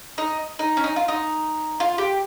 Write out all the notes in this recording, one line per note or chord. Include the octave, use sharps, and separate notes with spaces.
D#4
D#4
C#4
D#4
F4
D#4
F4
G4